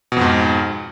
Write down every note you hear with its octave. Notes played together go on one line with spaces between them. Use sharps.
F2 G#2 B2